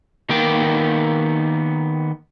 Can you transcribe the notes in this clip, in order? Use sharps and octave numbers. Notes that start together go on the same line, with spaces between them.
D#3 A#3 B3 A#4 G5